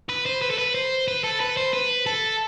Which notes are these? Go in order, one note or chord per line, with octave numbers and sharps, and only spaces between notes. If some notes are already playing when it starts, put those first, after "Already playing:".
B4
C5
B4
A4
B4
C5
B4
A4
B4
C5
B4
A4